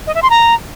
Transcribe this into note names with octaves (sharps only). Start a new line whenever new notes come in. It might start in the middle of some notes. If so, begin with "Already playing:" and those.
D#5
E5
C6
A#5